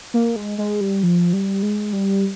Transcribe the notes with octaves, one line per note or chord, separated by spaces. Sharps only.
A#3
G#3
G#3
G3
F3
G3
G#3
G3